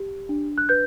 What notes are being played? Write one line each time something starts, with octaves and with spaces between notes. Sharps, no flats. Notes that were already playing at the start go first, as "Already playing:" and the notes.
Already playing: G4
D4
F#6
B4 G6